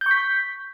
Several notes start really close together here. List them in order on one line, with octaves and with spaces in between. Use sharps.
G6 C#6 B6